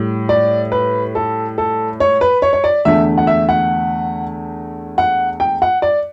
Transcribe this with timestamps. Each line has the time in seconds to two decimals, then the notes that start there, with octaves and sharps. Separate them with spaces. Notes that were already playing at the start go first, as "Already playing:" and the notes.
Already playing: A2 G3
0.29 D5
0.72 B4
1.15 A4
1.58 A4
2.00 C#5
2.21 B4
2.42 C#5
2.53 C#5
2.64 D5
2.85 E2 D3 A3 E5
3.18 F#5
3.27 E5
3.49 F#5
4.98 F#5
5.40 G5
5.62 F#5
5.82 D5